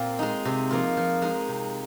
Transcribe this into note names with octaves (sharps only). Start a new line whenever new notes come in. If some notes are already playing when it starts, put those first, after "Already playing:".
Already playing: A#2 C4 F4
G#3 D#4
C3
F3 A#3 F4
F3
G#3 D#4
C3